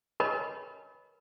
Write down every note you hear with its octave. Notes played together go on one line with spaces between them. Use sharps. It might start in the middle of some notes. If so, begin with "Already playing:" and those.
A#4 B4 C#5 D#5 G#5 B5